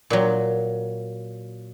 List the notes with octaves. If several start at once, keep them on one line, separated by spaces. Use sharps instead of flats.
A#2 F#3